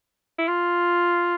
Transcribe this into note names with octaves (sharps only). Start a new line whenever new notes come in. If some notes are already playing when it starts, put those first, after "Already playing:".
E4
F4